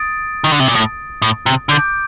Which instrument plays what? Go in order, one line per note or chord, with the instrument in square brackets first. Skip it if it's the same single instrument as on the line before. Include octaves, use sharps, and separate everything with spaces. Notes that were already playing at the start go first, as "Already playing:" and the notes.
Already playing: [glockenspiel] D#6 A6 D7
[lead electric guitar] D#3
D3
C3
A#2
A2
A2
C3
[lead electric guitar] D3 [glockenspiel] D6 G6 D7